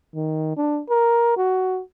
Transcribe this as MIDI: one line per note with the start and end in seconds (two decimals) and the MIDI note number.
0.15 0.56 51
0.57 0.80 62
0.90 1.35 70
1.37 1.80 66